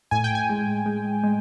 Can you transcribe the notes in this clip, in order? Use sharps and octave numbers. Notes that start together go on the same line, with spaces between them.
A2 G#5
G5
G#5
G#3
G#3
G#3